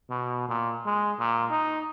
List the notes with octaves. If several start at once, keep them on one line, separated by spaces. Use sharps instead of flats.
B2
A#2
G#3
A#2
D#4